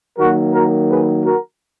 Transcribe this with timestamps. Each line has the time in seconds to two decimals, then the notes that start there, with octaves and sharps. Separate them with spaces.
0.18 D#3 F#3 A#3 F#4 A#4
0.53 F#4 A#4
0.90 G#4 B4
1.25 F#4 A#4